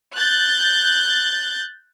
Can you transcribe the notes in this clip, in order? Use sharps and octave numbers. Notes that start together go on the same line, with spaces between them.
F#6 G6 A6